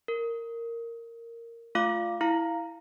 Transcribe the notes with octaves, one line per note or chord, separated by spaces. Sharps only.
A#4
A3 F4 F5 D6
E4 F5 A#5